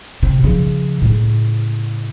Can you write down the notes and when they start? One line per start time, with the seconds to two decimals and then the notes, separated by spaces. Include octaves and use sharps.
0.23 C3
0.44 C#3 F3
1.02 A2 C#3